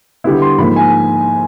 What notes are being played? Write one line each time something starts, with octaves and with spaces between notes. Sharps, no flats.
D3 G3 B3 E4
C6
G#2 F3 A#3 B5
G#5